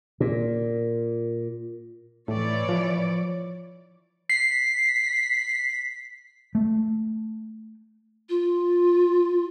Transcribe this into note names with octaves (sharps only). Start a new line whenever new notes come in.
A#2
A2 E3 C#5 D5
F3
B6 C7
A3
F4